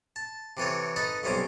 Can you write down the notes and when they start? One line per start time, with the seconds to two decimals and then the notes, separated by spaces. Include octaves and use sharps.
0.16 A5
0.57 C3 E3 A4 C#5
0.96 D#4 A4 B4 D#5 A5
1.23 B1 C3 G3 C#4 C5 D6